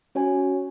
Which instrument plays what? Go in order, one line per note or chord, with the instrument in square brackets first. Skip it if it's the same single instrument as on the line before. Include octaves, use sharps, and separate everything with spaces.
[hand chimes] C#4 F#4 C#5 G#5